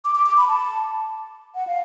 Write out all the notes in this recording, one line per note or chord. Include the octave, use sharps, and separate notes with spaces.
D6
D6
D6
B5
A5
F#5
F5